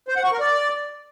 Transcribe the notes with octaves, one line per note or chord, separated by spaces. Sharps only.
C5
F#5
C#6
A#4
D5